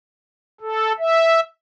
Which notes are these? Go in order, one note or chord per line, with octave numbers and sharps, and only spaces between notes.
A4
E5